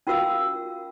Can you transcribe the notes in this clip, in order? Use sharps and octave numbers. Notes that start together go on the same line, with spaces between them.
C#4 F4 F#4 A#4 F5 E6